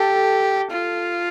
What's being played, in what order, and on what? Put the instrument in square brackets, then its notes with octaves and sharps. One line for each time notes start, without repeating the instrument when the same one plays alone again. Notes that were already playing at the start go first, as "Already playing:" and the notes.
Already playing: [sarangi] G4 [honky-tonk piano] A4
[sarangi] F4